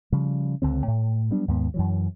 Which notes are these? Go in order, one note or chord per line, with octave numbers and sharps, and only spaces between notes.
C#3 F3 G3
C#2 D3 C4
A2
F#3 G3 B3 D4
D#2 G#2 B3
F#2 E3 F#3